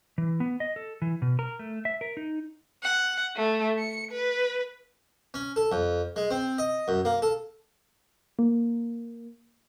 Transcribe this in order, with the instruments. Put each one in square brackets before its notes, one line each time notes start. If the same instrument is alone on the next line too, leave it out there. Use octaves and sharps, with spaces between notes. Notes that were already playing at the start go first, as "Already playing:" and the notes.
[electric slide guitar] E3
B3
D#5
A4
E3
B2
A#4
A3
E5
A#4
D#4
[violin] F#5
A3
C#7
B4
[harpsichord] C#4
A4
F2
G#3
C4
D#5
F#2
A#3
A4
[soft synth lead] A#3